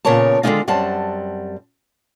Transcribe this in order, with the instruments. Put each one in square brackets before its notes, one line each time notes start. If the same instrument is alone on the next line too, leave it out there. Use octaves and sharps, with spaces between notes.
[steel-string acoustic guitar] A#2 C#3 B3 A#4 C#5 A5
D3 D#3 G3 G#3 D#4 F4
F#2 G3 C4 F#5 A5